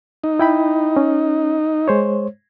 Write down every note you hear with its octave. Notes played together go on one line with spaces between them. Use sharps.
D#4
E4 G5 B5
C#4
G#3 C5 C#5